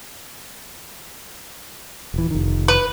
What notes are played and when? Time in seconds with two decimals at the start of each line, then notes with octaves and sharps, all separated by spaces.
2.14 D#1 E3
2.31 F1 D#3
2.68 B4